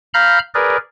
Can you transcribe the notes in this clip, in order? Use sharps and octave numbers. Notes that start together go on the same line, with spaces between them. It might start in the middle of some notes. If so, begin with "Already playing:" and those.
F5 A#5 B5 F6 G6
G#4 A#4 B4 D5